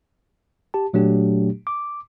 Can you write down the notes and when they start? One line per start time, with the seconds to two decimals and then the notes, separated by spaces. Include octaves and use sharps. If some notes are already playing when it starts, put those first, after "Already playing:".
0.74 G4 A5
0.93 A#2 F#3 A3 D4 G4
1.67 D6